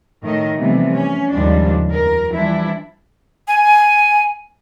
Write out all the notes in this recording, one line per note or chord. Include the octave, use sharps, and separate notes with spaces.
A2 D#3 A3 A#4 D#5
C3 E3 F3 G3 A3 B3
C#4
D#2 G#2 C#3 F3 G3 D4
F2 A#4
E3 F3 G3 D4 E4
G#5